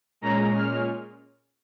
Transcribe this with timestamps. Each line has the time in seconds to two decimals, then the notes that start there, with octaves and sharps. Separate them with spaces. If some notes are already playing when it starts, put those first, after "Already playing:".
0.21 A#2 G#3 C#4 A#5
0.54 F6